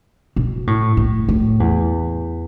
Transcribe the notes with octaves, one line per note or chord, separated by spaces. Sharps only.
B2
A2
A2
A2
E2